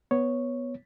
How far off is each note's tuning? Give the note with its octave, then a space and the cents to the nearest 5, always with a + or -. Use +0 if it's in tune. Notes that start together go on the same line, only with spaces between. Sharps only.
B3 +0 C#5 +0